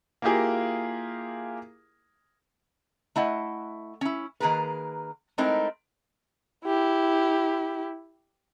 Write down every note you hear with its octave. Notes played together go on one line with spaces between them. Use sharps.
A#3 E4 F4 G4 G#4 A#4
A3 E4 D#5 F#5
C#4 E4
D#3 A#3 G#4 A#4 B4
G#3 A3 C4 D#4 E4 A#4
E4 G4